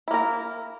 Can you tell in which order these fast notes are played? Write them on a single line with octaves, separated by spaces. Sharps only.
E4 A#3 A#4